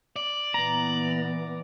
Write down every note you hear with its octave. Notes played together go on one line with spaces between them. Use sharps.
D5 F#7
A#2 E3 B3 A#5